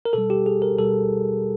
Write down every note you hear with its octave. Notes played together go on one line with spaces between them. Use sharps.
A#4
B2 G3 A4
G4
G#4
A#4
B2 G3 A4